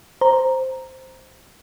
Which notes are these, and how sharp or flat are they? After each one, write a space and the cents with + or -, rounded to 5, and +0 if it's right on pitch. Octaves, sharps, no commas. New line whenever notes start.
C5 +0 A#5 +0